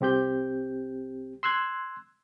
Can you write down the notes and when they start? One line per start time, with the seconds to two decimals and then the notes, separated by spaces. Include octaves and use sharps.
0.01 C2 C4 G4 G6
1.43 C6 E6 F#6 G#6